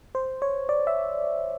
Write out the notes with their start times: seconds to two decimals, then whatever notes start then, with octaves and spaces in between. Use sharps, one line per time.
0.15 C5
0.42 C#5
0.69 D5
0.87 E5